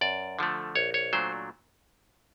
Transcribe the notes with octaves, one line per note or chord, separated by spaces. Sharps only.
F#2 D5
D3 F3 A3
A#1 C#5
C#5
A#2 F#3 A3 D4 C5